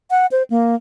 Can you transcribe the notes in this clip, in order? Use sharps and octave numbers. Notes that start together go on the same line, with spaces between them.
F#5
C5
A#3